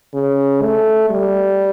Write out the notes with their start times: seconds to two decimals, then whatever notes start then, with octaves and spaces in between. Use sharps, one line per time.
0.14 C#3
0.62 A3
1.10 G3